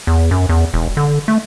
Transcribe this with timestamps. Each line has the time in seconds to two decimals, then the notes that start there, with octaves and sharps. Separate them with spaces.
0.07 E2
0.31 F#2
0.49 E2
0.74 E1
0.97 D3
1.28 A3